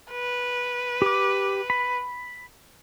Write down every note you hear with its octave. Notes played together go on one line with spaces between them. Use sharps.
B4
G4 D6
B5